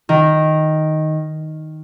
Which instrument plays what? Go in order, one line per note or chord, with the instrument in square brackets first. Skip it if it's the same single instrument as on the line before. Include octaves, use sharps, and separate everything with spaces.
[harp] D#3